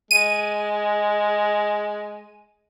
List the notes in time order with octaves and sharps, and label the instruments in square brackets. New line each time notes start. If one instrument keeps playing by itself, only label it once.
[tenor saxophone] G#3 [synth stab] D#7